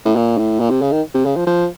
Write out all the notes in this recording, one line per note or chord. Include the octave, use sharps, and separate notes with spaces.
A2
A#2
A2
A#2
C3
C#3
D#3
C3
C#3
F3
F3